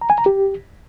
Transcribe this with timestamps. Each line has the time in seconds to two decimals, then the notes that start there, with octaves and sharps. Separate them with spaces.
0.01 A#5
0.10 G#5
0.18 A#5
0.26 G4